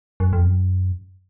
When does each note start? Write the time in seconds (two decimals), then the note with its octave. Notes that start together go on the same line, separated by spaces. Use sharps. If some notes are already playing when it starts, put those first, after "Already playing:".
0.20 F#2
0.33 F2
0.45 F#2